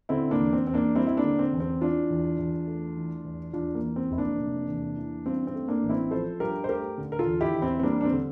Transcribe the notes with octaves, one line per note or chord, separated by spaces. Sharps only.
D3 C4 E4
A#3 D4
E2
C4
E2 C4
A#3 D4
G3 C4 E4
E4
A#3 D4
D3
C4
E2
C4
E3 D4 F4
E2
E2
A3
E3
E2
E2 D4 F4
A#3
E3
C4
F1 E4
A#3 D4
C3
E2
E3
G2 C4
C4
A3
A#3 D4
A1
C4 E4
F3 A4 C5
G2 G4 A#4
C5
A3 G4 A#4
D3
A#4
F4 A4
E2
E4 G4
E2
C4 E4
C4
G3 A#3 D4
D4
C4
D3